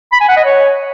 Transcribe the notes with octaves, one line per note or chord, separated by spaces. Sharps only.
B5
G#5
F#5
D#5
C#5